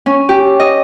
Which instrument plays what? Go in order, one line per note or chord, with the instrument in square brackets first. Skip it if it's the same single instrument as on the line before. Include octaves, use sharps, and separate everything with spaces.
[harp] C#4
G4
D#5